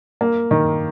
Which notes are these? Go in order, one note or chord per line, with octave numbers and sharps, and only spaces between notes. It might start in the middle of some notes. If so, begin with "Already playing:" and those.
A#3
D#3